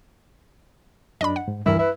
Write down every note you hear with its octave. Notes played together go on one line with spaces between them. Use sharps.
F#2 D4 D#5 B5
F#5
G#2
C#2 G2 E3 G3 E4 A#4
E4 B4 E5